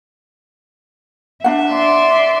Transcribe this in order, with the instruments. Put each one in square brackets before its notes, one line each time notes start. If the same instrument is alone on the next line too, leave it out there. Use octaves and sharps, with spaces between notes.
[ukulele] D4 D#4 F#5 [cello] E5
[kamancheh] D5 C6